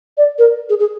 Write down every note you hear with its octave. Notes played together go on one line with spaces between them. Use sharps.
D5
A#4
G#4
G#4